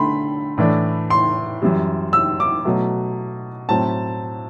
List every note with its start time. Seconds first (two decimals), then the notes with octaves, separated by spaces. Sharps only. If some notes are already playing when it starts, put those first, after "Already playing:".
Already playing: D3 A3 B5 C6
0.58 A2 E3 A3 D4
1.10 C6
1.62 F#2 E3 G3
2.13 E6
2.40 D6
2.65 B2 F#3 A3
3.69 A2 F#3 C4 A5